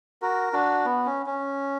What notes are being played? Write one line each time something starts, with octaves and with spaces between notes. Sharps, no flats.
F#4 A#4
D4 F#4
B3
C#4
C#4